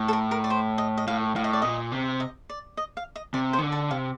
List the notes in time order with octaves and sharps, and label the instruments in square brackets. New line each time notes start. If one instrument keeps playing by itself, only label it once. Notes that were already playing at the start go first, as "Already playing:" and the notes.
Already playing: [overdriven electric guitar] A2
[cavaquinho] A4
A#4
A#4
D5
C5
D#5
D#5
[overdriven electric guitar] A2 [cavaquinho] F5
[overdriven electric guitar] A2 [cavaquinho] F5
[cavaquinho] D#5
D5
[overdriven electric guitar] A#2 [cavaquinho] D#5
[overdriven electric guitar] C3
[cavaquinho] D#5
D5
D#5
F5
D#5
[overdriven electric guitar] C3 [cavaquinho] D5
[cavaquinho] C5
[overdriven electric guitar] D#3
D3
[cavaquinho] A4
[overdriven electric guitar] C3 [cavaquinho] F5